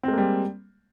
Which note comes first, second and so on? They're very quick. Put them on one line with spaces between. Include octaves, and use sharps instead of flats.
C4 G#3 A#3 G3